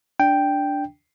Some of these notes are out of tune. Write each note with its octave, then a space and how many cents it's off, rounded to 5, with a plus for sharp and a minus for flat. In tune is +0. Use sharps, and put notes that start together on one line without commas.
D4 -5 G5 +0